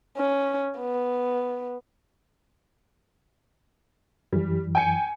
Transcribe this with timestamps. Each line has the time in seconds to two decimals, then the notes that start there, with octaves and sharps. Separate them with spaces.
0.17 C#4
0.79 B3
4.33 F#2 E3 G3
4.75 G5 G#5 C#7